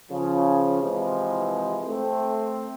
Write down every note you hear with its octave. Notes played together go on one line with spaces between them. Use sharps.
C#3 F3
C3 E3 F3 G#3 E4
A3 C4